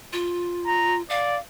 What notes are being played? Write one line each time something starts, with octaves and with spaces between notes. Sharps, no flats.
F4
A#5
D5 F5